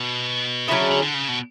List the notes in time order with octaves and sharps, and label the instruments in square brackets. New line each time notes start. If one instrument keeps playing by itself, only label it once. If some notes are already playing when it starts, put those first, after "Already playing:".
Already playing: [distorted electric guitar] B2
[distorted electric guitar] C#3 [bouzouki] F#3 C#4 E4 G#4
[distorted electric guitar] D3
D3
D3
C#3
B2